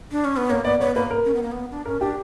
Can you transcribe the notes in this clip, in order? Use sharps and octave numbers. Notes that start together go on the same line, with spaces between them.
D4
C#4
B3
A#3 C#5
B3 D5
B3 C#5
A#3 B4
A#4
C#4
B3
A#3
B3
D4
C#4 A#4
D4 G4